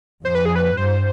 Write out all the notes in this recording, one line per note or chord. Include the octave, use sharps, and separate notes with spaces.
F2 C5
B4
G#4
B4
G2 C5